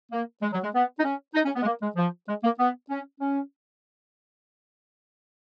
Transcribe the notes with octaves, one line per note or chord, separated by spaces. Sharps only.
A#3
G#3
F#3
G#3
B3
D#4
C#4
D#4
C#4
B3
G#3
A#3
G#3
F3
G#3
A#3
B3
C#4
C#4